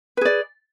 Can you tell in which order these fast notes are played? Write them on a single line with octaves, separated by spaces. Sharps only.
B4 G#4 D5